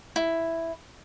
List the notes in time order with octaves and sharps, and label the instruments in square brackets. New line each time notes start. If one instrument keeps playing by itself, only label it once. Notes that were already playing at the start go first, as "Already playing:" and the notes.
[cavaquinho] E4